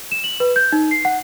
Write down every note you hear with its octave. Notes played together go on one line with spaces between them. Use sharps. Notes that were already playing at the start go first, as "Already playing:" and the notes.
E7
F#7
B4
G6
D#4
C7
F#5